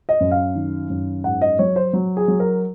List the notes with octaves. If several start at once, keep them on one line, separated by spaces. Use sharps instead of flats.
D#5
F#2
F5
D#3
F#2
G#2 F#5
D#5
F#3 C#5
C5
F#3
G#4
F#3
A#4